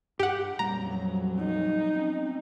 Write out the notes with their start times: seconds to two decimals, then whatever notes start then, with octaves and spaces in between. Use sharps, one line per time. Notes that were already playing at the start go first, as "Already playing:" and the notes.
0.19 G2 G4 F#5
0.59 F2 A#2 F#3 G3 A#3 A#5
1.39 D#4
1.95 C4 C#4